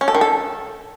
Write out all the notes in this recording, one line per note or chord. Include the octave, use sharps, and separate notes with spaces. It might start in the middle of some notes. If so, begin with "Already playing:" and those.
C#4
A4
D#3
A4